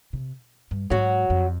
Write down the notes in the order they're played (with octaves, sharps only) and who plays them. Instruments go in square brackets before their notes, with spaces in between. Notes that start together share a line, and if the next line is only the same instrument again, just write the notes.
[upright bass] C3
G2
[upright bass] G#2 [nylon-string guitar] F#3 F#4
[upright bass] F2